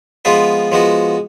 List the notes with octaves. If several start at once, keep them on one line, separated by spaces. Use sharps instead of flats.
F3 G#3 B3 F4 B4
F3 G#3 B3 F#4